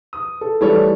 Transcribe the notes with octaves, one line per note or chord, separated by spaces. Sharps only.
D#6
A4
E3 G3 A3 A4 C#5